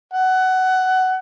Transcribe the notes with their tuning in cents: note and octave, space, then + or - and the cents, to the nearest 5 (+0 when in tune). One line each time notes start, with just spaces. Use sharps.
F#5 +15